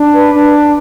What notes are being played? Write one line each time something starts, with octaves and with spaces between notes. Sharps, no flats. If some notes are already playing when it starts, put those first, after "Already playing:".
Already playing: D4
B4
D4